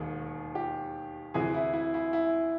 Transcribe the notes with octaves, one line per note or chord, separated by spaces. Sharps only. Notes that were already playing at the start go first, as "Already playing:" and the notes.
Already playing: E1 D#2 D#3 G#4
G4
D2 C3 E3 G#4
E4
E4
E4
E4